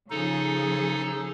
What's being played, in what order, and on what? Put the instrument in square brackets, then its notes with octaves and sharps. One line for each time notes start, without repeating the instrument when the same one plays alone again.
[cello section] C#3 F3 G#4 [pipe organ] D#4 A4